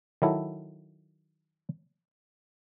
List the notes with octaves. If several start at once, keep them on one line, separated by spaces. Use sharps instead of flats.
D#3 F#3 E4 A4